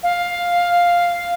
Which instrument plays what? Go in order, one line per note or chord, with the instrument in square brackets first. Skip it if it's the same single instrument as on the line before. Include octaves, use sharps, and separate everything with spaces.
[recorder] F5